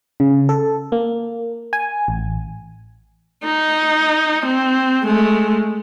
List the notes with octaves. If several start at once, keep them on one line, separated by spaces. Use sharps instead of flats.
C#3
A4
A#3
G#5
A1
D#4
C4
G#3 A3